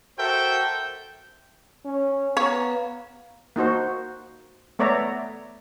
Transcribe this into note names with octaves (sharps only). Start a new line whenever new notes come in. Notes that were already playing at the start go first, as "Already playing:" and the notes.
F#4 A4 A#4 C5 E5 G5
C#4
B3 C#5 F5 A#5
A#3 D#4 F#4 C5
A3 B3 C#5 D5 E5 A#5